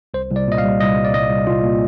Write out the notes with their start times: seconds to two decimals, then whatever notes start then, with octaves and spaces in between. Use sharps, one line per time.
0.14 C2 C5
0.31 C2
0.36 D5
0.48 A#2 D#5
0.58 F5
0.64 G3
0.81 C2 D#5
0.97 C2
1.05 D5
1.14 C2 D#5
1.30 C2
1.47 C2 F4
1.64 A#2